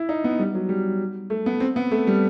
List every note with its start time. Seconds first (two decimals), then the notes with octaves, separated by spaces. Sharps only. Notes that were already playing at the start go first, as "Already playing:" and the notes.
Already playing: E4
0.09 D#4
0.24 B3
0.39 G3
0.54 F#3
0.69 G3
1.30 A3
1.46 B3
1.60 C4
1.76 B3
1.91 A3
2.07 G3